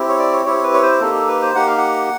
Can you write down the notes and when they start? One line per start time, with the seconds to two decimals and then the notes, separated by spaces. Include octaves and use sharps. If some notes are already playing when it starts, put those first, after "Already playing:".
Already playing: C4 E4 G4
0.09 C#5
0.19 D5
0.33 C#5
0.46 C4 E4 G4 C#5
0.63 B4
0.74 C#5
0.83 C5
1.00 A#3 D#4 G4 A4
1.15 A4
1.28 B4
1.42 C5
1.55 A#3 D#4 G4 F#5
1.67 F5
1.78 F#5